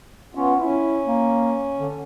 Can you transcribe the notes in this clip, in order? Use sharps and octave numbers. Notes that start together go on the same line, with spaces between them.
B3 C#4 F4
C#4 E4
A#3
D3